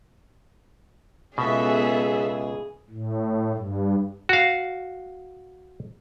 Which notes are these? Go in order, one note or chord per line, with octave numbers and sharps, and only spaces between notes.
C#2 B2 B3 G#4 A4 E5
A2
G2
F#4 F5